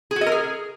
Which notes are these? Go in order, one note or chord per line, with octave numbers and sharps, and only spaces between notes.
G#4
F#4
D#5
A#4
G#4